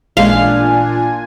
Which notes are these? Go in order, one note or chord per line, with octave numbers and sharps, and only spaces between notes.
A1 A#2 G#3 D4 F4 F5 G#5